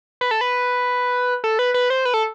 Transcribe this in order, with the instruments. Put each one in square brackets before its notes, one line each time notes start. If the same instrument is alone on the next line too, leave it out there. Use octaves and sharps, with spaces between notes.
[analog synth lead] B4
A4
B4
A4
B4
B4
C5
B4
A4